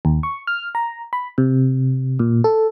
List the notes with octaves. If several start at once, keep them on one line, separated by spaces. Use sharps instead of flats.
D#2
C#6
F6
A#5
B5
C3
A#2
A4